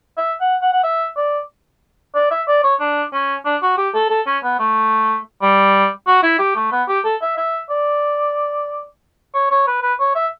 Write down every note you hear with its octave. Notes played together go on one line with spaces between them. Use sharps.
E5
F#5
F#5
F#5
E5
D5
D5
E5
D5
C#5
D4
C#4
D4
F#4
G4
A4
A4
C#4
B3
A3
G3
F#4
E4
G4
A3
B3
G4
A4
E5
E5
D5
C#5
C#5
B4
B4
C#5
E5